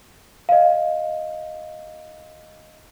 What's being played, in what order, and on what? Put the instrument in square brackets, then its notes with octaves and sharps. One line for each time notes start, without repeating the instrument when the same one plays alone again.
[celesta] D#5 F5